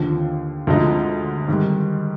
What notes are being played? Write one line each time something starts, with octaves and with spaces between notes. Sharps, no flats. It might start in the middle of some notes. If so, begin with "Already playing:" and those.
Already playing: D#2 D3 F3
D2 D3 F3 G#3 D#4
G#2 D#3 G3